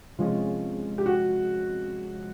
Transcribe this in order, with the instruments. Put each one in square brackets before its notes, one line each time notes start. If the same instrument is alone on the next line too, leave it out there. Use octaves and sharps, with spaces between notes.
[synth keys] C3 F3 G#3 C#4 [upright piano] F4
[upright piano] G4
F#4